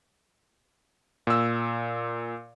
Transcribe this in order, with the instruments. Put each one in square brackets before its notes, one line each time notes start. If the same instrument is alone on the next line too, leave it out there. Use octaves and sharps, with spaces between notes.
[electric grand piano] A#2 E6